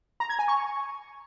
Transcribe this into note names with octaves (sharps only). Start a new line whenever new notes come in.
A#5
G#6
G#5
C#6